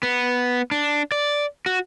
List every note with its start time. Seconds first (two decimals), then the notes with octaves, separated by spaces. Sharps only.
0.03 B3
0.71 D4
1.12 D5
1.66 F#4